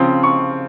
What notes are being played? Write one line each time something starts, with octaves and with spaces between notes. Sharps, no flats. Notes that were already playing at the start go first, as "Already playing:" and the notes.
Already playing: C#3 F3 C4
C#6